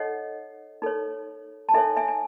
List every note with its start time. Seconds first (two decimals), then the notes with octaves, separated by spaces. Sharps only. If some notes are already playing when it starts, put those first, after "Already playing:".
Already playing: D#4 A4 C#5 D#5 F#5
0.82 D#4 A4 C#5
1.69 A5
1.74 D#4 A4 C#5 E5 G#5
1.96 E5 G#5
2.08 G#5